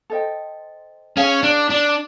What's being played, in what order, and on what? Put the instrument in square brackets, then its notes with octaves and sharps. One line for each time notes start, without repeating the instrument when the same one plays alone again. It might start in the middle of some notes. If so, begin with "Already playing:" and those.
[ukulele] A4 C5 D#5 G5
[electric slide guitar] C#4 [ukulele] G#4 C#5 F5 G#5
[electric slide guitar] D4
D4